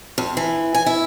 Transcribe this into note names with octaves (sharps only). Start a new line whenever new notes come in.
F2
E3
G#5
E4